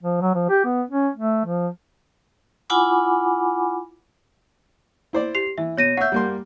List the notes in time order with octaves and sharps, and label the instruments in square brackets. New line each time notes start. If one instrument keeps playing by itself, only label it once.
[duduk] F3
F#3
F3
G4
B3
C#4
A3
F3
[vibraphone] E4 F4 F#5 G#5 B5 D6
[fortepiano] E4 C5 D5
[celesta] G4 C7 F7
[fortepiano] E3 [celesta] E5
[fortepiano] B2 [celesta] C#5 A#6 D#7
[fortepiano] C#5 E5 [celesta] F#5 G6
[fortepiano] G3 A#3 C6